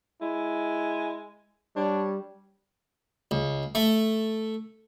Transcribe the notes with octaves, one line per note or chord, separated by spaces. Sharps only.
G#3 E4
G3 D4 C#5
C#2
A3